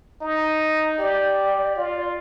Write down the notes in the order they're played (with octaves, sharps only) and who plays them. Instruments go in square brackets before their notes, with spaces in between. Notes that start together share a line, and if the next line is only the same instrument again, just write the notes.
[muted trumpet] D#4
[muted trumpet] G4 [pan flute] D5
[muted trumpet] F4